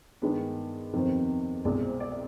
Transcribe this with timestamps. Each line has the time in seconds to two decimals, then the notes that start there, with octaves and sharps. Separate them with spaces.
0.22 G2 D#3 G#3 B3 B4
0.93 F2 C3 D#3 B3 C5
1.65 C2 B2 G#3 D5
1.82 C5
2.00 D5
2.12 D5